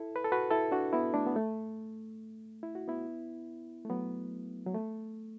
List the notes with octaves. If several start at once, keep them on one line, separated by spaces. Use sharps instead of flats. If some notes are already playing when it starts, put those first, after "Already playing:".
Already playing: E4 A4
B4
A4
F#4 B4
E4 A4
D4 F#4
B3 E4
A3 D4
B3
A3
E4
F#4
B3 E4
A3
F#3 B3
F#3
A3